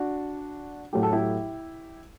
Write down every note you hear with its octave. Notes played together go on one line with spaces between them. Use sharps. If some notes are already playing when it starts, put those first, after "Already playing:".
Already playing: D4 F#4
A2 F#3 A3 G4
A4
E4 G4